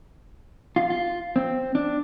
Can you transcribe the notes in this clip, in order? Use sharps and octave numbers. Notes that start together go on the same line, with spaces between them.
F4
F4
C4
D4